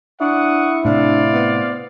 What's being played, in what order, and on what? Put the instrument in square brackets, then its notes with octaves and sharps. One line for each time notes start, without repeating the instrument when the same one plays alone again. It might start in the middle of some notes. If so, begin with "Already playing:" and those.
[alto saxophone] D4 [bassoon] E4 [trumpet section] F#5 C#6 D#6
[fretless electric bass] A2 C3 [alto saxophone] D4 [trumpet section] C5 D5 F5
[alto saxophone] B3